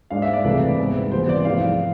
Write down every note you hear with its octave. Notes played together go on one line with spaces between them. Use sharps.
G#2 G#3 D4 F5
E5
D5
C2 C3 E3 A3 B4
G#2 G#3 B3
C2 C3 E3 B3 C5
D5
G#2 F3 A3 E4 F5